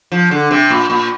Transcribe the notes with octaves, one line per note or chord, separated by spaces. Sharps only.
F3
D3
C3
A#2
A#2